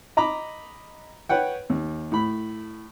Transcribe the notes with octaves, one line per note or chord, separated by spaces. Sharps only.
D#5 A#5 B5 D6
B4 C#5 F#5 G5
D#2
A2 B5